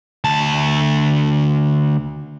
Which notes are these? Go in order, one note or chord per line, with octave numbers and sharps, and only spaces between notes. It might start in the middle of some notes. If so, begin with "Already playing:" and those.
D2 A5